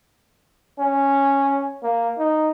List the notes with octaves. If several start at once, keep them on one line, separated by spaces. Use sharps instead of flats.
C#4
A#3
D#4